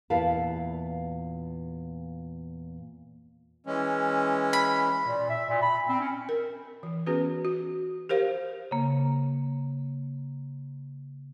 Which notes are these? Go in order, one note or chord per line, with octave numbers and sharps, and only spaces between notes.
E2 A#2 E4 B4 F5 A5
E3 G#3 C#4
B5
A#2
E5
A#2
B5
C4
C#4
A#4
E3
B3 C#4 F#4 G#4 B4
F#4
G4 A#4 C5 F5
C#3 A#3